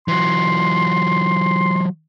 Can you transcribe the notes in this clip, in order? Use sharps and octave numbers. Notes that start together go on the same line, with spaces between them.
E3 F#3 C6